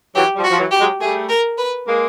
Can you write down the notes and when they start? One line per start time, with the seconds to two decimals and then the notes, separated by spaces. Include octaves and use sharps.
0.15 E3 F#3 G4
0.36 F3 G3
0.44 F#4
0.51 F3
0.58 E3 F#3
0.71 G4
0.79 F#3 G#3
1.00 G3 A3 G#4
1.29 A#4
1.58 B4
1.87 G#3 A#3